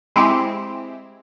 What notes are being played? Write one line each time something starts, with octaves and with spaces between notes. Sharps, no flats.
G#3 C4 E4 G4